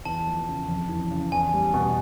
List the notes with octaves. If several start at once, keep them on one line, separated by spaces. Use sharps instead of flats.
E2 A5
F3
C#3
F2
E3
C#3
E2 G#5
G3
B2